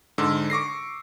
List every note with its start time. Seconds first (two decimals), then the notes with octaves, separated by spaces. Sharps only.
0.18 G#2 D3 E6
0.50 C#6 D6 A#6 C7